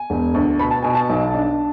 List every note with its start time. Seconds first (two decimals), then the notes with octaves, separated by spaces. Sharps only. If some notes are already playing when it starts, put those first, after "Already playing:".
Already playing: G#5
0.10 E1
0.34 D2
0.59 B2 B5
0.71 A5
0.83 B2 G#5
0.94 A5
1.10 B1
1.34 D4